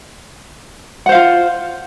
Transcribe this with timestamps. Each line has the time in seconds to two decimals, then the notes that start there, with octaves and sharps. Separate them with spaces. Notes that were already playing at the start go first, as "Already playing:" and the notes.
1.06 F#5
1.09 C5
1.12 F5
1.15 F4